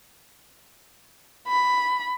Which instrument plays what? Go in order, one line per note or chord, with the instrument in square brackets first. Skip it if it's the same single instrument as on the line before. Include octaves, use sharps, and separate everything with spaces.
[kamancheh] B5